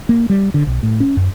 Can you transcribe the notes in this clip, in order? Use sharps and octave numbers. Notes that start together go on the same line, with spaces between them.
A#3
G3
D3
B1
A2
C#4
F#2